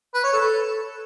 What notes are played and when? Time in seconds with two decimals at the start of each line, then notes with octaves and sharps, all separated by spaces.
0.14 B4
0.24 C#5
0.33 A4